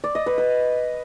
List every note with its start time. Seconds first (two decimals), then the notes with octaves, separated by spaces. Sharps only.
0.04 D5
0.15 D#5
0.26 B4
0.38 B4